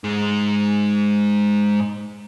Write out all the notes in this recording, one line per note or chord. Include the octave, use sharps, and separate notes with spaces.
G#2 G#3